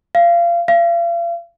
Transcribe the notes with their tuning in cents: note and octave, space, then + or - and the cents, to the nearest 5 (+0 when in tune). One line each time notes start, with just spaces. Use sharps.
F5 -25
F5 -40